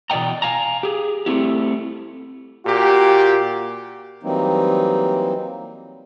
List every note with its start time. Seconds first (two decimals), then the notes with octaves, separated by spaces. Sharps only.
0.10 B2 E3 D5 D#5 G5 A#5
0.42 F5 G#5 A#5
0.83 G4 G#4
1.26 A3 C4 E4 G4
2.66 A#2 F#4 G4
4.23 E3 F#3 G3 A#3 C4 D#4